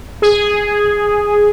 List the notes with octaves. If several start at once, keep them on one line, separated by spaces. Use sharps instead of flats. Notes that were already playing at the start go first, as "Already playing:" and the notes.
G#4